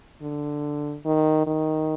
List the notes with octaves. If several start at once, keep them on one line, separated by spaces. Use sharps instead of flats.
D3
D#3
D#3